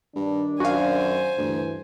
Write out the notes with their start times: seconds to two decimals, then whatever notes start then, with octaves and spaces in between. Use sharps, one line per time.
0.16 G2 D#3 D4
0.60 F#2 F#4 C5 F5 G#5
1.38 D2 G2 E3